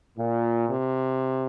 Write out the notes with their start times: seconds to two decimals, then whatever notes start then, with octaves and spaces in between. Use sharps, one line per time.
0.17 A#2
0.68 C3